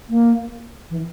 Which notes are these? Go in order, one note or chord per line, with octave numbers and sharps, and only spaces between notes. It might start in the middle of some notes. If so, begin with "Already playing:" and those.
A#3
E3